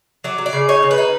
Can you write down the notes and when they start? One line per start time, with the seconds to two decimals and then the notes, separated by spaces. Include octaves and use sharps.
0.24 F#3 D5
0.38 F#3
0.46 D5
0.53 C#3
0.68 D#4 C#5
0.83 C#3
0.91 B4
0.98 D#4